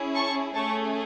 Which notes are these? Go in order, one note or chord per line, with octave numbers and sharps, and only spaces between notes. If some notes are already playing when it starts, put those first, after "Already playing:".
Already playing: C#4 E4 G#4
A5 C#6
A3 C#4 G#4 A5 C#6